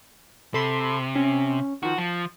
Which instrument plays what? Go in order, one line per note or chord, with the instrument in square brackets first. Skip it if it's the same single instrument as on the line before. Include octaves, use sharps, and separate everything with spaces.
[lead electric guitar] C3 [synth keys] A4 B5 C6
[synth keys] C#4
[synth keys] D#3 F3 [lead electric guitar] F#4
[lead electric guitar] F3 [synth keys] A5